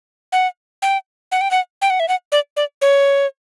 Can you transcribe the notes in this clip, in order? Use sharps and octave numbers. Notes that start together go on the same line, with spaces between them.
F#5
G5
F#5
G5
F#5
G5
F#5
E5
F#5
D5
D5
C#5